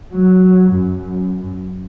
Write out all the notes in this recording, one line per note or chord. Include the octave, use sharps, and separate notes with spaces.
F#3
F#2